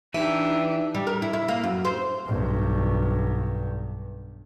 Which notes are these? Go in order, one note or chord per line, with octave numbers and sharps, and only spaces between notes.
E3 D4 D#4 G4 E5
G3
A#4
E4
E4
A#3
F#2
C5
B1 G2